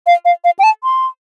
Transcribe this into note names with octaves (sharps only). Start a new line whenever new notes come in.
F5
F5
F5
G5
A5
C6